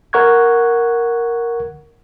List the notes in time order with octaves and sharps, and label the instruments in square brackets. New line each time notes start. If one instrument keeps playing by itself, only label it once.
[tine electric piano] A#4 F#5 C#6 F#6 G#6